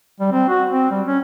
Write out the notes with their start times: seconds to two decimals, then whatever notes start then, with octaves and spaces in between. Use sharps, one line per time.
0.20 G3
0.31 C4
0.48 F#4
0.70 C4
0.91 G3
1.06 C#4